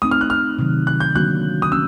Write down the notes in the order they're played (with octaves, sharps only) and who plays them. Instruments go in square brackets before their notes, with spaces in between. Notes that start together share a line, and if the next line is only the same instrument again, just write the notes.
[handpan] A3 C4 D#4 [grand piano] D#6
[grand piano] F6
F#6
F6
[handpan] C3 D#3 F#3
[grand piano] F#6
G6
[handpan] D3 F#3 A#3 D4 F#4 [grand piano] F#6
[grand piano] D#6
[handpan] F3 A3 C#4 [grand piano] E6